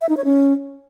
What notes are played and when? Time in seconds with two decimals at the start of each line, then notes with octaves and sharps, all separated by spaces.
0.01 E5
0.09 D#4
0.17 C#5
0.25 C#4